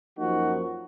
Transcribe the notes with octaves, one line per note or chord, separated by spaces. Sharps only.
F#2 F3 A#3 D#4 F#4